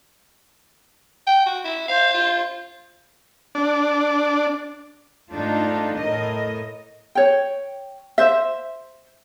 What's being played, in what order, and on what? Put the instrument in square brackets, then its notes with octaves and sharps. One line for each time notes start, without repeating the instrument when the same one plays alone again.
[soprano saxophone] G5
F#4
E4
[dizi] C5 [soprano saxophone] F5
[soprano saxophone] F4
[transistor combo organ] D4
[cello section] G#2 A3 D4 D#4 F4
A2 A4 A#4 D#5
[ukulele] C#5 G5
C5 E5